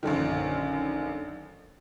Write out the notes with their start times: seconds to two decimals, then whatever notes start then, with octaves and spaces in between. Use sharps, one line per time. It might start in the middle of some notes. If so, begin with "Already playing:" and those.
0.03 A#1 F#2 D3 D#3